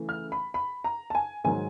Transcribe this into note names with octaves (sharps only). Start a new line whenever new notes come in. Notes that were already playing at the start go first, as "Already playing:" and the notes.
Already playing: C#3 E3 A3
F6
B5
B5
A#5
A5
G#5
G#2 D#3 F#3 G#5